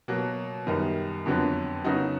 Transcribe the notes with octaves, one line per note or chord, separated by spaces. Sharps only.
B2 F#3 A#3
F#2 D#3 G3 B3 D#4
F2 D3 F#3 B3
C#3 F#3 B3 D#4 F#4